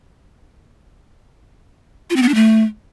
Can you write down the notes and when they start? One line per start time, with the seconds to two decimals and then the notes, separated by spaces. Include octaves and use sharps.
2.10 F4
2.16 C4
2.22 B3
2.28 D4
2.35 A3